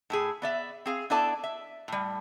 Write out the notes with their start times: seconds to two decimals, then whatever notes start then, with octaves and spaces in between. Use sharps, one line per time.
0.10 A2 E4 G#4
0.42 B3 D5 E5
0.86 C4 G#4 F5
1.10 B3 D4 E4 A4 D5 A5
1.44 E5
1.88 A2 G3